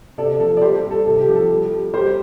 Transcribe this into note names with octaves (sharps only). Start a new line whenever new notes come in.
C3 A4 D5
F3 A4
D5
G3 G4 C5
A4
G3
A4
C3 A4
G4
F3
A4
G3
G3
G3 G4 C5